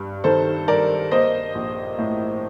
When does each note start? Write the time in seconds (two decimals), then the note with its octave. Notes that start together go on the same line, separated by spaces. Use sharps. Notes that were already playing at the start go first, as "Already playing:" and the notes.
Already playing: G2
0.24 D#3 A4 C5
0.68 G3 A#4 D5
1.11 A#3 C5 D#5
1.55 A#1
1.99 A2